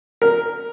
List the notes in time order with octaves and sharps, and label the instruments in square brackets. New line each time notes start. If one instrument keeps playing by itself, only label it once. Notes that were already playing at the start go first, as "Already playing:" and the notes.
[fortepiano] A#4